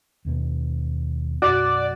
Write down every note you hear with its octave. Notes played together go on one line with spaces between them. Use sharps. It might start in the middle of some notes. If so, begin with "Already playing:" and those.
D#2 B2 B3
B1 F#2 F#4 D5